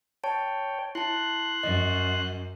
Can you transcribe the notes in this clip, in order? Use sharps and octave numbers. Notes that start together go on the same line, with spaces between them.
C#5 G5 A5
E4 A5 C6 F#6
F#2 D#5